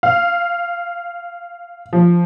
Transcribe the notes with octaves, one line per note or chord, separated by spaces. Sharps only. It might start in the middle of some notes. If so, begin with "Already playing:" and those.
F5
F3